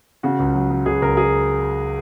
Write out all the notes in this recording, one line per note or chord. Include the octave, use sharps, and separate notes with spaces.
C#3 F#4
C#2
F#3
F#3
C#2 G#4
C#2 A#4
G#4